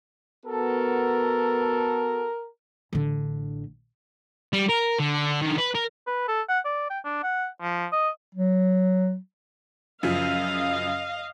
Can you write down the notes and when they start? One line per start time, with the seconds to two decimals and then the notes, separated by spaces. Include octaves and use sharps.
0.46 B3 F#4 A4 A#4
2.93 A1 D3
4.53 G3
4.69 A#4
4.99 D3
5.42 D3 D#3
5.58 B4
5.75 A#4
6.07 B4
6.28 A4
6.49 F#5
6.65 D5
6.90 G5
7.05 D4
7.23 F#5
7.61 F3
7.92 D#5
8.35 F#3
10.03 F#2 C#3 F3 D#5 F5